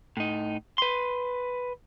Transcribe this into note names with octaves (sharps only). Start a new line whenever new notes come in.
A2 D#4
B4 C6